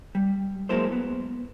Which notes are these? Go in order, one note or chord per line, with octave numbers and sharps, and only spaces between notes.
G3
F#3 G#3 A#3 E4 A4 C5
B3